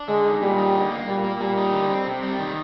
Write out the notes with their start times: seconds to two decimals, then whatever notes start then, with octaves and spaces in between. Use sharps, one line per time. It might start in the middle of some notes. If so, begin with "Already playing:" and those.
Already playing: D4
0.08 D3 G#3
0.25 D#4
0.42 A#2 G3
0.58 D#4
0.75 D3
0.91 A#3
1.07 A#2 G3
1.24 A#3
1.40 A#2 G3
1.58 D#4
1.73 D3
1.90 C4
2.07 C3
2.23 G3
2.39 D#3